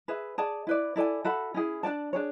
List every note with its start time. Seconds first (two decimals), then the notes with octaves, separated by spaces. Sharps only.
0.08 G#4 B4 E5
0.38 G#4 D5 A5
0.67 E4 B4 D5
0.96 E4 A4 D5 G#5
1.24 F#4 A4 E5 B5
1.54 C#4 E4 G#4
1.83 D4 G#4 D5 A5
2.13 D4 G#4 C#5